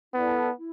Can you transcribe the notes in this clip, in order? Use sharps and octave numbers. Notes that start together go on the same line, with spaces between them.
B3 E4 A4 D5 A5
E4